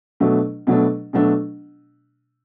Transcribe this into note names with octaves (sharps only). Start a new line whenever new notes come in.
B2 F#3 A3 D4
B2 F#3 A3 D4
B2 F#3 A3 D4